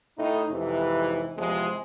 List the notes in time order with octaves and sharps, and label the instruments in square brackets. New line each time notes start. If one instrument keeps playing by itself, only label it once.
[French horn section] A2 D#4
F2 G#2 C3 E3
E2 C3 F3 G#3